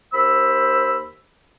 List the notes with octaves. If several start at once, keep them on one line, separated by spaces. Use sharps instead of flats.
D#2 C5 B5 E6